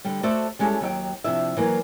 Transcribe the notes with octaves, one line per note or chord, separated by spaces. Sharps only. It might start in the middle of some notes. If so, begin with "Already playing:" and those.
D3 G3
A3 F#4 A4 C5 D5 E5
G3 G#3 C#4 E4 G4 A4
D#2 F#3 E5 G5
C3 F3 D4 E4 E5
E3 F#3 A#3